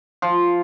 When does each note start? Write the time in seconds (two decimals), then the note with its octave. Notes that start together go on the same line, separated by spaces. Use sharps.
0.22 F3